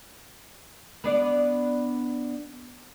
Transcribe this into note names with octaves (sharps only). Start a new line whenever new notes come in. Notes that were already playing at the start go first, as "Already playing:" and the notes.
B3 D4 D5